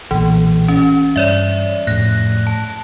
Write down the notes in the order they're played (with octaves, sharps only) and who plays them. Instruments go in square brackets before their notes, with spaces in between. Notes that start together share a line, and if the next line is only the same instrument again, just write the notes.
[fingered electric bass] B1 A#2 [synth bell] E3
[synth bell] C#4
[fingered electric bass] G2 [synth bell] C#5 D5 E5
[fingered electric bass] F2 A2 [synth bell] F#6 A#6
[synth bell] A5